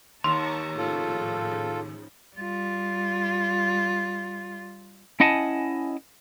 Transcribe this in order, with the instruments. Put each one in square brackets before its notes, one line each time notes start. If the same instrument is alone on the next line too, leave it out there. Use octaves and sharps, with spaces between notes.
[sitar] D#2 [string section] A5 A#5 C#6 [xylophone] C6
[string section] A2 C#3 F3 [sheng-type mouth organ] F4 A4
[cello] G3 F4
[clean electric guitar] C#4 E4 D#5 F#5 G#5 A5